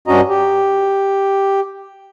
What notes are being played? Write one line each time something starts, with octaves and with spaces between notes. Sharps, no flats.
G2 C#4 D4 F#4 D#5 A#5
G4